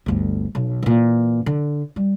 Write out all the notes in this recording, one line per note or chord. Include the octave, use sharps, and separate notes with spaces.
G1 D2
B1
A#2 E3
D3
G3